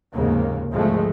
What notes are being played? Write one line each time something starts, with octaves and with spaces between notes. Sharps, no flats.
F1 D#2 G#2 C#3 A#3
G#1 D2 F3 G#3 A3